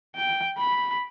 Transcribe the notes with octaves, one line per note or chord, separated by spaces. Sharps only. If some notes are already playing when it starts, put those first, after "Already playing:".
G5
B5